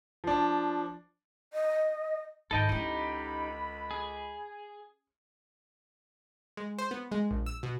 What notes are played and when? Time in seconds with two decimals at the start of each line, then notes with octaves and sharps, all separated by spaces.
0.24 F3 D4
1.53 D#5
2.51 C#2 G#2 D3 D#3 A4 D#5 G5 B5
2.69 C#4 D#4 E4 G4
3.91 G#4
6.57 G#3
6.78 C5
6.91 B3
7.12 G#3
7.31 A#1
7.46 E6
7.63 B2